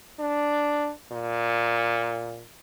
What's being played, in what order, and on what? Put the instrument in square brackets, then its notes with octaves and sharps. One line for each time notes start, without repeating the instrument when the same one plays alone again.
[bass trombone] D4
A#2